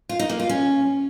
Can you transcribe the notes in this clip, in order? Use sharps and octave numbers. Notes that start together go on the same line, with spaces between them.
F4
D#4
A#3
F4
C#4